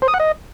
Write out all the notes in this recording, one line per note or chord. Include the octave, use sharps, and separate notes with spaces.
C5
D#6
F#5
D#5